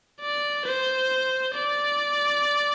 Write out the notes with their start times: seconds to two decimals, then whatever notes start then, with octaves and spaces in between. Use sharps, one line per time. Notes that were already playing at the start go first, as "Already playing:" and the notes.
0.21 D5
0.65 C5
1.54 D5